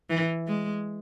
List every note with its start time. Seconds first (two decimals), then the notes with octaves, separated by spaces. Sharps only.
0.10 E3
0.48 G#3